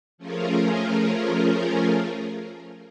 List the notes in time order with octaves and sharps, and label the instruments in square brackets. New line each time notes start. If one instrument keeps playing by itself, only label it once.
[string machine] F3 A3 C#4 F4 G#4 A#4